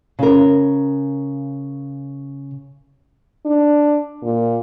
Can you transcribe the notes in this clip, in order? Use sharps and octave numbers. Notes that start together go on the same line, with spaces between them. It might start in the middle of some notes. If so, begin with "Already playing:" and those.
C#3 A#4
D4
A#2